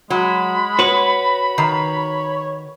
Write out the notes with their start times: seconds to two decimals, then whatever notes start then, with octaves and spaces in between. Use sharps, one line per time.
0.10 F#3 G#3 B5
0.79 F#4 B4 C#5
1.58 D#3 C#5